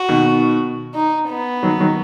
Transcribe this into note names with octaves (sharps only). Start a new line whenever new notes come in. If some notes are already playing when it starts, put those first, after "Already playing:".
Already playing: F#4
B2 D#3
D#4
B3
D#3 F#3
D#3 F#3